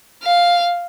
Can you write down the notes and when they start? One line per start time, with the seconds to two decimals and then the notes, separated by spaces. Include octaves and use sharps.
0.23 F5